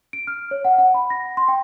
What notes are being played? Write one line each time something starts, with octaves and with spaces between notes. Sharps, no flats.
D7
F6
C#5
F#5
F#5
B5
A#6
C6
G5